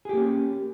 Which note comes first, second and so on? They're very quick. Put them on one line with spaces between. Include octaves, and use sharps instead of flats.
G#4 G4 A#3 C#4